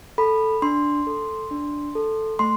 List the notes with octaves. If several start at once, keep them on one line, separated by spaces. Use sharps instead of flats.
A4 B5
D4 C6
A4
D4
A4
A3 C6